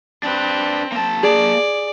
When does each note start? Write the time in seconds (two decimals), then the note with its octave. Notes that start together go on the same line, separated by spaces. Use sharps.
0.23 C4 D4 B4
0.92 A#3 A5
1.23 G#4 D5